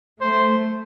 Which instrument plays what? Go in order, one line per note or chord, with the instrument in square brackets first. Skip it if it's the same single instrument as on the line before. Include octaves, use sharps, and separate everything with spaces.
[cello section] A3 [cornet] C5